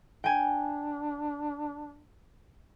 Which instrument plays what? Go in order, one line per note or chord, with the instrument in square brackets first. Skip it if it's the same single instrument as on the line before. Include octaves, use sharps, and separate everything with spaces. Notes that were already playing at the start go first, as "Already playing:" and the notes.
[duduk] D4 [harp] G5 G#5